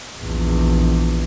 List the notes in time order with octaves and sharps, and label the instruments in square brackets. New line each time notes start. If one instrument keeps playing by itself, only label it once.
[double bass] A#1 E2